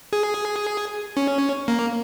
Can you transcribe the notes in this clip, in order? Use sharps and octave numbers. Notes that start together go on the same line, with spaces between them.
G#4
C#4
A#3